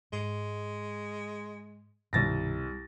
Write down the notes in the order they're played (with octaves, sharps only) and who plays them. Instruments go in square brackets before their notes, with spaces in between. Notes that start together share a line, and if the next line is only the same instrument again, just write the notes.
[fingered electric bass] G#2 [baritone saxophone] G#3
[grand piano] C2 A6 A#6 [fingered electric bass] G2 B2 D#3